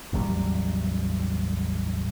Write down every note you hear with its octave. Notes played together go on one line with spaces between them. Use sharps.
A1 E2 F#3 G3